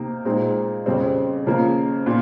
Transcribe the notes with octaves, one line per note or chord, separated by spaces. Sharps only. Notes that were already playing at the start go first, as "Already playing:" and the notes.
Already playing: C3 A#3 D#4
A#2 G#3 C4 D#4
F2 C#3 G3 C4
C#3 F3 A#3
A#2